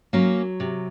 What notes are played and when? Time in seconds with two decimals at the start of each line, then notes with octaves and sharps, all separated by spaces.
0.13 F#3 A#3 C#4
0.60 C3